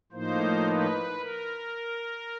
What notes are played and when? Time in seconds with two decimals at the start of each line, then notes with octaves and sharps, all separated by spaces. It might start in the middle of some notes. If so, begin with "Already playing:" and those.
0.12 A2 F3 A#3 D#4 C5
0.66 B4
1.19 A#4